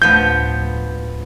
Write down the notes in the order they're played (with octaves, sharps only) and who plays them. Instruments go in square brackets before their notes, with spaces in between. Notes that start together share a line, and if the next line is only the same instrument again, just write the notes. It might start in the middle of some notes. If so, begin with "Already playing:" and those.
[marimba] D2 A2 A3 [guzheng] F3 B3 [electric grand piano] G6